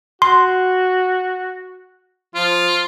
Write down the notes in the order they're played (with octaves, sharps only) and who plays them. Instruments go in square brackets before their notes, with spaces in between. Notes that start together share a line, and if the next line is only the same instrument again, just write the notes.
[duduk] F#4 [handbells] C6
[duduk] F3 [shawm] F4